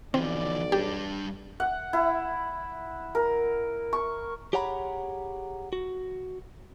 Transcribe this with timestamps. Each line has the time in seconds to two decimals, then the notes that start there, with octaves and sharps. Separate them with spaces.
0.14 B1 E3 F3 C4 D5
0.72 G3 D4 G4
1.60 F#5
1.93 E4
3.15 A#4
3.93 C#6
4.53 G4 G#4 C#5 F#5 A#5 B5
5.73 F#4